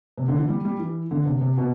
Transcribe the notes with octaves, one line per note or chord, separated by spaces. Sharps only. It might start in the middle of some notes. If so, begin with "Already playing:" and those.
C3
D3
E3
G3
G3
E3
D3
C3
C3
B2